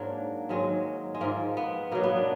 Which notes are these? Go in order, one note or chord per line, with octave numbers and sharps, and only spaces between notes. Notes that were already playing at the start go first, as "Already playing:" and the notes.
Already playing: G#2 F#3 A#3 D4
G#2 D#3 F#3 G#3
G#3
G#2 F3 A#3
B3
B2 F#3 A#3
B3
D4